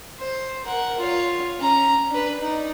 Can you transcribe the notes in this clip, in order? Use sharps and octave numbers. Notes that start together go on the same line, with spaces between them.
C5
A#4 F#5
F4 C#5
C#4 A#5
D4 B4
D#4 D5